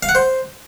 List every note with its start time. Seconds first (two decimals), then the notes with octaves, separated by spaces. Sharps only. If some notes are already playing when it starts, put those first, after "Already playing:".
0.03 F5
0.09 F#5
0.15 C5